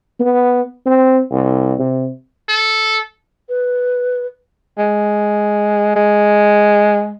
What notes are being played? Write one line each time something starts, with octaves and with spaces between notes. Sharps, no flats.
B3
C4
C2
C3
A4
B4
G#3
G#3